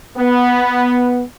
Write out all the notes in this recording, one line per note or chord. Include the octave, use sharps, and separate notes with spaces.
B3